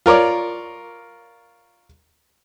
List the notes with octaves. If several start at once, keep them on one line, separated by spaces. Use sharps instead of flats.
F4 A#4 C#5 D5